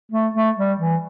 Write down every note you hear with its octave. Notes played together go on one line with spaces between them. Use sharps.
A3
A3
G3
E3